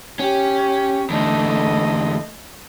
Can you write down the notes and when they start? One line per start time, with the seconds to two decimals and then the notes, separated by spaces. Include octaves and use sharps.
0.19 C#4 G4
1.10 E2 D3 A3 D#5